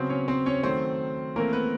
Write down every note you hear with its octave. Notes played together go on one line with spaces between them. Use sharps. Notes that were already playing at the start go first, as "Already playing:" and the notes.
Already playing: C#3 F#3 B3 C4 C5
C#4 C#5
C4 C5
C#4 C#5
D#3 F#3 A3 C4 C5
E3 A3 A#3 C4 A#4
B3 B4